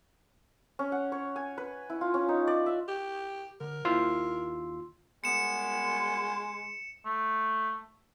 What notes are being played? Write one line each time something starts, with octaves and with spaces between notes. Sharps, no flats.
C#4
F#5
C#5
G#5
B4
E4
F4
C#4
D#4
D5
E5
G4
D3 A#4
D#2 E4 F4 C5 C6 E6
F#2 G3 G#3 B3 C#7 E7
A3